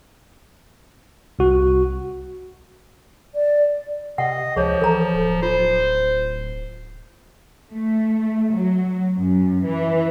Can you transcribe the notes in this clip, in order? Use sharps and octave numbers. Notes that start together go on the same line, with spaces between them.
C2 F#4
D5
C3 D#5 F#5
C#2 F3 G#4 C#5
E3 A4 A#5
D1
F4 C5
A3
F#3
F#2
E3